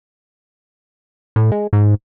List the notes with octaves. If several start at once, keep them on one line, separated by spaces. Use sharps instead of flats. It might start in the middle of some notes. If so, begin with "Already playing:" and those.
A2
G#3
G#2